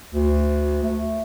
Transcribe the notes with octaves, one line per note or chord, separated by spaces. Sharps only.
D2
A3